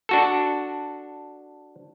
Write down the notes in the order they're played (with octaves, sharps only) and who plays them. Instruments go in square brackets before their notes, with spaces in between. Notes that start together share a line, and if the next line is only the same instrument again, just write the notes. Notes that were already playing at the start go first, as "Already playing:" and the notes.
[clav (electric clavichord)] D4 F#4 A4